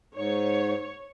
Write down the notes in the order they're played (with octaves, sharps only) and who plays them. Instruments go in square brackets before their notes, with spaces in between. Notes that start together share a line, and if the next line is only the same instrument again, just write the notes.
[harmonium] G#2 [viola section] C#5